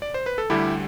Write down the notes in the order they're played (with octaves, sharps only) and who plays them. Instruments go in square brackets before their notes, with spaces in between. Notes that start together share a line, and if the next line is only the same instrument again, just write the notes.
[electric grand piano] D5
C5
B4
A4
D2 D3 G3 E4 G4